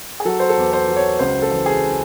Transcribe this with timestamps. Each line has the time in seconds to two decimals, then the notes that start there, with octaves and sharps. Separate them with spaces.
0.20 G#4
0.25 F#3 A4
0.39 C5
0.49 A4
0.57 E2
0.73 C5
0.88 F#3
0.96 C#5
1.19 C#2 C5
1.42 A4
1.51 E3
1.66 G#4